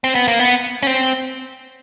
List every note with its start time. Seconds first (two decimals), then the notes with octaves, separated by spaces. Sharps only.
0.04 C4
0.15 B3
0.28 A#3
0.39 B3
0.83 C#4
0.87 C4